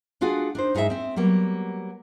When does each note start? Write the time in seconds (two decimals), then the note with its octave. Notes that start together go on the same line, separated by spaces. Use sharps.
0.21 A3 D4 F4 F#4 G#4
0.55 D4 D#4 C5
0.75 G#2 D#4 G#4 B4 E5
0.90 C4 E5
1.16 F#3 G3 A#3 B3